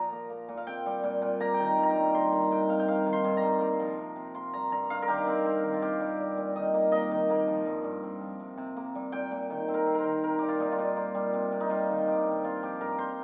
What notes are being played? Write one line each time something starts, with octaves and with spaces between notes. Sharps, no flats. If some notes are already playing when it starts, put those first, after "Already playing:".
Already playing: A#2 F3 A#5
A#3
A#3
A#2
F5
C4 G5
G3
A#2
A#2
A#3 A#5
G5
D#3
A#5
G2
A#5
G5
G2
A#3 C6
D#3 A#5
C3 G5
C3 F5
G5
A#3 F5
D#3
C6
G2
A#5
G2
A#3
F3
C3
C3
A#3 C6
G3 A#5
G2 A#5
G2 F5
A#4
D#3 G4
C4
C4
D#3
F4
C4 G4
G3
A#2
A#2
D#3 D#5
A#3
A#3 D#5
D#3
A#3
F3
G2
G2
C4
F3
C3
C3
A#3
G3
A#2 G5
A#2
D#3
C4
A#4
C4
A#4 C5
D#3
C4 A#4
G3 G4
F4
A#2 D#4
F4
A#2
A#3
G3
C3
C3
D#4
G3 F4
D#3
G2 G4
G2
C4 F4
F3 G4
G2 A#4
C5